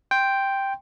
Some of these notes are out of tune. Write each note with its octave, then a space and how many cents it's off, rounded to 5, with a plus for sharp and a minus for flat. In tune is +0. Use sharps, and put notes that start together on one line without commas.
G5 +0 C6 +0